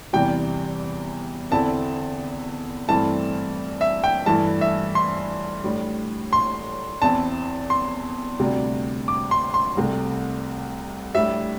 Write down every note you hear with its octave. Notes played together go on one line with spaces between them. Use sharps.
E2 C3 E3 G3 G5
E2 D3 C4 E4 A5
G2 E3 A3 C4 E4 A5
E5
G5
G2 E3 A3 E4 A5
E5
C6
A2 G3 D4
C6
E2 E3 C4 E4 A5
C6
D2 C3 G3 D4
D6
C6
C6
C2 C3 A3
A2 G3 D4 E5